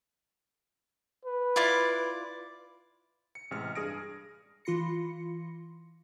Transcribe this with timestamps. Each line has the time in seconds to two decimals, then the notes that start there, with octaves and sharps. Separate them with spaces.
1.25 B4
1.56 E4 F4 D5
3.35 C#7
3.51 A1 C3 G#3 F6 C#7
3.75 G2 G#4 D#6 A#6 D7
4.65 E3 F4 B5 C6 A#6 C#7